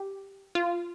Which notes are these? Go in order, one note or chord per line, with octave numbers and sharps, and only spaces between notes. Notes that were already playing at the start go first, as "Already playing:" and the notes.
Already playing: G4
F4